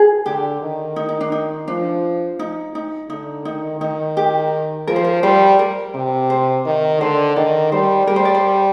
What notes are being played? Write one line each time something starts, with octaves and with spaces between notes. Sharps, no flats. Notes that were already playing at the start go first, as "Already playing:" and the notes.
Already playing: G#4
D3 G4
D#3
D#4
D#4
D4
D#4
F3 D4
D#4
D#4
D3 D#4
D#3 D#4
D#3 D#4
G4
F3 A#4
C5
A#4
G3 C5
A#4
C3
C5
D#3
D3 C5
D#3 D5
G3 C5
G3 A#4
C5
D5
C5